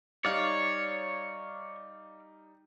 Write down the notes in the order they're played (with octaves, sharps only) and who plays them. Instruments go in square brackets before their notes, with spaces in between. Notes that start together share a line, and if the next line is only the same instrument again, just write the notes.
[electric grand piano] G3 D#4 [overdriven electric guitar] C#5 [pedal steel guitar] D5 F5